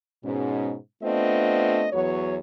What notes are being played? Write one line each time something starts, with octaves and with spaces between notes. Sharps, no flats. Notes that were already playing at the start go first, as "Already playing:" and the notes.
G#2 B2 C#4
A3 B3 C4 D4 F4 D#5
E2 F#3 B3 F#4 C#5